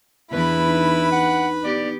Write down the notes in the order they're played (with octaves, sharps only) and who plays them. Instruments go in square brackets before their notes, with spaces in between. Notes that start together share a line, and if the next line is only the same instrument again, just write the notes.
[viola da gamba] E2 E3 D4 [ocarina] B3 [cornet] E4 [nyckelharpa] B4 B5
[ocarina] D#4
[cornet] F#5
[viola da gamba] B3 G4 [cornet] D5